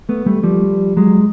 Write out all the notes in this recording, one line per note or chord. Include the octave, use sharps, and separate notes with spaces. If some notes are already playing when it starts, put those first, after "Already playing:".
A3 B3
G3 A3
F3 G3
F#3 G#3